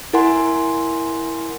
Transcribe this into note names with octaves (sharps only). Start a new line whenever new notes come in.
E4 A#4 F#5 G#5 C6